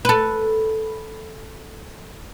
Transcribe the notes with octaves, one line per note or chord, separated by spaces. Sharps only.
A4 B4